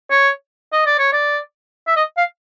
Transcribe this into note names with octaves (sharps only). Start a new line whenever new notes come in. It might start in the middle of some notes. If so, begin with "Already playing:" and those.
C#5
D#5
D5
C#5
D5
E5
D#5
F5